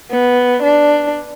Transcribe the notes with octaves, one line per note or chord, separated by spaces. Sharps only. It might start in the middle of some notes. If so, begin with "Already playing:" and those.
B3
D4